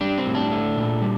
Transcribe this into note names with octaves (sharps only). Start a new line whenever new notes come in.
G3 D4
C4
A2
D4
A3
A#2
G3